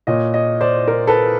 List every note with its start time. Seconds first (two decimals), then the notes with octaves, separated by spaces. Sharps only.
0.07 A#2 C#5 D#5
0.34 C#5 D#5
0.61 C5 D5
0.88 A#4 C5
1.07 A4 B4